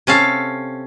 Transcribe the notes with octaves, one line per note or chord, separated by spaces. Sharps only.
C3 C#4 A4 F5